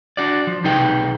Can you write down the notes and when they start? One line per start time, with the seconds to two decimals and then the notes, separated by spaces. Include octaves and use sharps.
0.17 D4 F#4 D5
0.47 F3
0.64 B1 C3 D#4 G#4 B4 G5